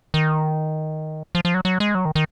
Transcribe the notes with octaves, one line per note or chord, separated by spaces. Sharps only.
D#3
F3
F3
F#3
F#3
G#3
F#3
D#3
D#3